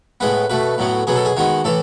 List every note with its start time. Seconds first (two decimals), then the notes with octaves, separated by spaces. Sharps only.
0.20 A2 G#3 B3 B4
0.50 B2 A3 B4
0.78 A2 F#3 B3
1.07 B2 F#3 B3 G#4
1.16 A4
1.25 G#4
1.36 D#3 G#3 B3 F#4
1.64 A2 E3 A4